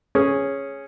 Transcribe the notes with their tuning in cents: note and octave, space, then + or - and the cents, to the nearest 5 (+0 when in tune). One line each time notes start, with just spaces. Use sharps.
C#4 -5 G#4 +0